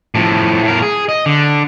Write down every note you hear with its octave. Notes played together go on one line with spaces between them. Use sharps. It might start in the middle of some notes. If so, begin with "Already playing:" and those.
A2 F3
A2 A#4
G#4
D#5
D3